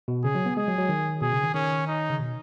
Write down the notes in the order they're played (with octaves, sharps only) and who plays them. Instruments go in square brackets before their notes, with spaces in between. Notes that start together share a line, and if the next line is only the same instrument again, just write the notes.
[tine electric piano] B2
[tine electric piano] C#3 [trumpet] G#4
[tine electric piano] F#3
B3
[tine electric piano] G#3 [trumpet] G#4
[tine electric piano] F#3
F#3
D#3
[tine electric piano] B2 [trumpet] G#4
[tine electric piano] C#3
D#3
[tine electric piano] D#3 [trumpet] C#4
[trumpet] D#4
[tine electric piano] C#3
B2